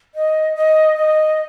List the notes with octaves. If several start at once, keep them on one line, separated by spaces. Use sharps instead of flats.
D#5
D#5
D#5